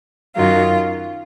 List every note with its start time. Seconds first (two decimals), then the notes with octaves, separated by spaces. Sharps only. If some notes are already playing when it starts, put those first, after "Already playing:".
0.35 F#2 D#3 F#3 F4